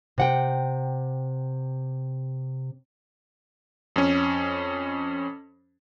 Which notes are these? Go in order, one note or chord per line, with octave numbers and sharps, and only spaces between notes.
C3 F#5 G5
F2 C#4